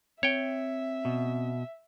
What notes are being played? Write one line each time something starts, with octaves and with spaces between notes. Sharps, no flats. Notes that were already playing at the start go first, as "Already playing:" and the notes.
C4 C#5 E5 G5
B2